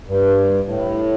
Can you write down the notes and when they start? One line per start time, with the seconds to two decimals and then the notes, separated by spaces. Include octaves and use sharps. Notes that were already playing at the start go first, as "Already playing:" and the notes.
0.08 G2
0.66 A2